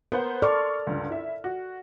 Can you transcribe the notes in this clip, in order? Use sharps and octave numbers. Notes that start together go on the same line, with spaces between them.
B3 A#4 C5 F#5
A4 D5 C6 C#6 F6
C#2 G2 D3
E4 E5
F#4